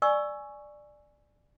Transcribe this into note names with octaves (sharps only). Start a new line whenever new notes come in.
D5 G#5 C#6 E6